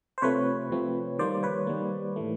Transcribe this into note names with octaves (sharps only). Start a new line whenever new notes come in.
C5
C3 F3 A3 C4 B4 C#5
C3 F3 A3 C4
D#3 G3 A#3 C5 D5
B4 C#5
D#3 G3 A#3
A2 E3 A3